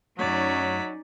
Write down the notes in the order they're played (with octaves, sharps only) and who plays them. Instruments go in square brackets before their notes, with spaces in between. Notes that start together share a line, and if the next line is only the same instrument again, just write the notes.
[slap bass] F#2 A3 [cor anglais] F#3 [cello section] C#4 D#4 [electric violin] D5 B6